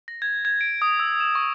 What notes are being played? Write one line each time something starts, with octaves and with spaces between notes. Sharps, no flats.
A#6
G#6
G#6
D7
D#6
E6
E7
C#6